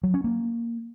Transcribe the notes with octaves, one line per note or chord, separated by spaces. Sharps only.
F#3
C#4
A#3